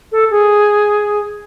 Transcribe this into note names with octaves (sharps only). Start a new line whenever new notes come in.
A4
G#4